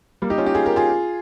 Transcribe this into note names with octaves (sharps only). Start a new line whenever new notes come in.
G3 A#3
D#4 G4
C#4 F4
D#4 G4
F4 G#4
G4 A#4
F4 G#4